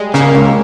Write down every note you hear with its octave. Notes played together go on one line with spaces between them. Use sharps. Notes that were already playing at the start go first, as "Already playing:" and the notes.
Already playing: G3 G#3
C#3 A#3
C#2